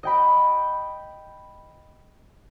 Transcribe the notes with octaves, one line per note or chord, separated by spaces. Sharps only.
D#5 G5 B5